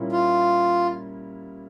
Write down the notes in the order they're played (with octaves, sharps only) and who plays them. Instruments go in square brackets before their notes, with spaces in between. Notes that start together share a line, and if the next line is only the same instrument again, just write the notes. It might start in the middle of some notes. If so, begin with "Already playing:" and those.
Already playing: [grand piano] A#2 G3 A#3 C#4 E4
[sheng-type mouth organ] F4